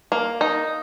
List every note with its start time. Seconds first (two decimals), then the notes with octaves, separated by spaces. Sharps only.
0.12 A#3
0.41 D#4